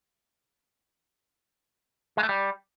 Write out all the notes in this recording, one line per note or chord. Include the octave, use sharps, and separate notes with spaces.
G#3
A3
G3